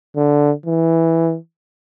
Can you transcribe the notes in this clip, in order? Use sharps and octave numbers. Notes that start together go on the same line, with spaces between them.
D3
E3